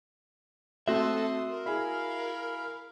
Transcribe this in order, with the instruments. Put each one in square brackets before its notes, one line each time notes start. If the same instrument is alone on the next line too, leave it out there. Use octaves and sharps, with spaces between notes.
[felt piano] A3 C4 [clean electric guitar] F#4 E5 [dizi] A4 [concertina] C6 D#6
[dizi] A#4
[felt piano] E4 G#4 [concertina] F5 B5